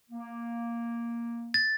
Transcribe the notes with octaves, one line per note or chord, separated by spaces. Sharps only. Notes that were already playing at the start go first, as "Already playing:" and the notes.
A#3
A6